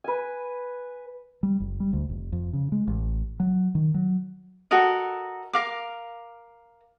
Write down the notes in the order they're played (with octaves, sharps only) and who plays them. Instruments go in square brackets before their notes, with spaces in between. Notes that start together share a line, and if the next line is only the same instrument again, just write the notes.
[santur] B4 G#5
[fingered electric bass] G3
F#1
G3
D2
F1
F2
C#3
G#3
A1
F#3
D#3
F#3
[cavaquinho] F#4 A4 A#4 D#5
A#4 F5 D6